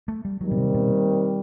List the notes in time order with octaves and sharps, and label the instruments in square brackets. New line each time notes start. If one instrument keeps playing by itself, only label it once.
[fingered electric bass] A3
G3
[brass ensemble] D#2 D#3 G3 C4 [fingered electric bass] F#3
[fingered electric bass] B2
C3
B2